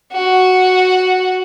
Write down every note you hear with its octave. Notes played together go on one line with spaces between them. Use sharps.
F#4